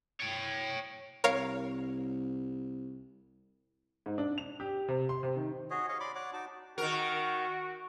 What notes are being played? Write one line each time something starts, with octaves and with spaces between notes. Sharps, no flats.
C#5 G5
C2 A#4 C#5 F5
G#2
D4
F7
G4
C3
C6
C3
D#3
F#4 G#4 C#5 D#5
C#5 D#5 F5 C#6
D5 B5 C6 D6
C#5 D5 F#5 D6
D#4 F#4 A5 D6
D#3 F#4 A#4